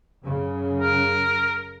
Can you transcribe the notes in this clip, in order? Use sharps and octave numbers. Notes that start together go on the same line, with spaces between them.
F#2 C#3
A#4